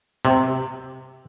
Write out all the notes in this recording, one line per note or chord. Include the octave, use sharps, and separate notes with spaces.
C3